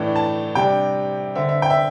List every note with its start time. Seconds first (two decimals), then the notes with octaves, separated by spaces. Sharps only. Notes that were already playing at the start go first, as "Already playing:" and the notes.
Already playing: A2 E3 A3 D4
0.16 A5
0.55 C3 G3 D4 G5
1.35 D3 C4 E5
1.49 E5
1.62 G5
1.70 E5